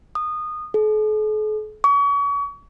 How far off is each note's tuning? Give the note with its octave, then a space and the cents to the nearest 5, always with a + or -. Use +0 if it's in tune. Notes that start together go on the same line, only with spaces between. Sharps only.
D#6 -20
A4 -45
C#6 +35